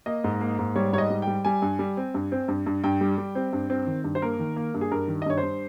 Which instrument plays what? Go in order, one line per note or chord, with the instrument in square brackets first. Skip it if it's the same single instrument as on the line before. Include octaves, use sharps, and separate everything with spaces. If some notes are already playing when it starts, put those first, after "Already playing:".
[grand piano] A#3 D#5
G#2
A#3
G#2
G3 C#5
G#2 C#5
D#5
G3
G3 G5
G3 G#5
G2
G3
C4
G2
C4
G2
G2
G2 G5
G3
G3
C4
G2
C4
D#3
G2
C5
A#3 A#4
D#3
A#3
G2
G#4
G2 A#4
D#3
D#5
G2 C#5
C5
G2